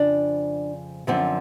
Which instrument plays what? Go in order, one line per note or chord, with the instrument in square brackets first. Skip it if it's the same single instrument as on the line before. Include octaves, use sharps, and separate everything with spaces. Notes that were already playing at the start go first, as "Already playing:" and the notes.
Already playing: [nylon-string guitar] F2 C#3 F3 D4
F#2 D3 F3 C4